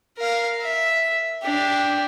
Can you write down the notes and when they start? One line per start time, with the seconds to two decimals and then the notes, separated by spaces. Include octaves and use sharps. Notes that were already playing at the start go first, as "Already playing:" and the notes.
0.18 A#4 F5
0.61 E5
1.42 D4 G4